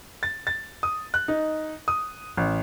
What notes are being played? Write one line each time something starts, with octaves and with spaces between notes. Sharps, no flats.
A6
A6
D#6
F#6
D#4
D#6
A1